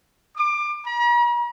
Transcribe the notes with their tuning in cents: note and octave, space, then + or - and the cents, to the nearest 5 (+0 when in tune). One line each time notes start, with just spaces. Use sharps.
D6 +25
A#5 +45